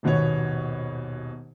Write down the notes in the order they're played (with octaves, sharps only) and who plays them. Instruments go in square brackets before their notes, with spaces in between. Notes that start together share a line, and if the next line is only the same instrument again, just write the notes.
[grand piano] D#1 G#1 B2 B3 C#5